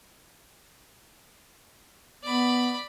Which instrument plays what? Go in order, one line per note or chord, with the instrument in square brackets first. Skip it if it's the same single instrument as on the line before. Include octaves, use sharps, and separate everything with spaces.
[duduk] B3 [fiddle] D5 B5